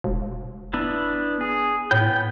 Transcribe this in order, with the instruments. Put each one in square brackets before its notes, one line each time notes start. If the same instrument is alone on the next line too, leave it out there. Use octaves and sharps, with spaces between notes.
[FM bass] E1
[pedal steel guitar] B3 D4 E4
G#4
[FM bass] A2 [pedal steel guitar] B3 G5